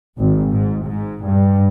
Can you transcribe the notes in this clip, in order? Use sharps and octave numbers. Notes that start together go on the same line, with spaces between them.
G#1
G#2
G#2
G2